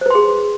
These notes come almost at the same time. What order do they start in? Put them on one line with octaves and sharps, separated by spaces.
C5 B4 C6 G#4